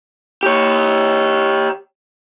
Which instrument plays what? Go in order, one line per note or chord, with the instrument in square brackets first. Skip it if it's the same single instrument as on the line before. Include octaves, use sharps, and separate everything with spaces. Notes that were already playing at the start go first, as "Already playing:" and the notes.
[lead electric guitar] G4 C#5